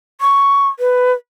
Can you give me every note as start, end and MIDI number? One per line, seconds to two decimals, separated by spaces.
0.21 0.68 85
0.79 1.12 71